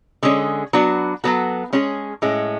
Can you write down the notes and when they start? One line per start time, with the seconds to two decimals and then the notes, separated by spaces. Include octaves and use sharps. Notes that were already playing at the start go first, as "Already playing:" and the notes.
0.23 D3 G#3 C#4 G#4
0.73 F#3 B3 D4 F#4
1.24 F#3 B3 F#4 A4
1.73 G#3 C#4 G#4
2.22 A2 G#3 C#4